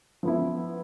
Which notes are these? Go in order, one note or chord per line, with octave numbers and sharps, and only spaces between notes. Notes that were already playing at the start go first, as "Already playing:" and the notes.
F3 B3 E4